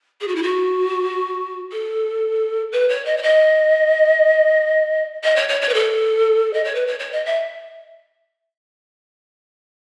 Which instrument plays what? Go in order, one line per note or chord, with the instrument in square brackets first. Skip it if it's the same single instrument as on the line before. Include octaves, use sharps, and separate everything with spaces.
[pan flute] G#4
F#4
E4
F#4
A4
B4
C#5
D#5
C#5
D#5
D#5
C#5
C#5
C#5
B4
A4
D#5
C#5
B4
C#5
C#5
D#5
E5